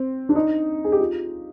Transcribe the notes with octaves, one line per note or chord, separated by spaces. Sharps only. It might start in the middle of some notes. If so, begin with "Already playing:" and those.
Already playing: C4
D4
D#4
G#4
G4
F4